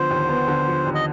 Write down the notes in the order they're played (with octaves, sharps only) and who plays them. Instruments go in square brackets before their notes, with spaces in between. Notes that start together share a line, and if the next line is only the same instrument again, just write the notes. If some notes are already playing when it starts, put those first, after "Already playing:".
Already playing: [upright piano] D3 F3 B3 [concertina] C5
[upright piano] D#2
B3
D3
F3
D#2
[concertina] D#5